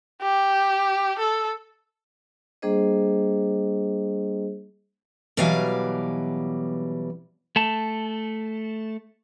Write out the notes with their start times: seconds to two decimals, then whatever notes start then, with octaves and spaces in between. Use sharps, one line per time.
0.22 G4
1.19 A4
2.62 G3 A#3 D4 G#4 C5 D#5
5.37 B2 E3 F#3 G3 F5 G#5
7.56 A3 A5